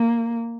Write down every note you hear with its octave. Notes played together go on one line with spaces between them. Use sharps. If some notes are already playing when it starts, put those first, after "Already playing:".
Already playing: A#3